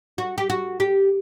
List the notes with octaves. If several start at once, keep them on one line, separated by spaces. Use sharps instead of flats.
F#4
G4
F#4
G4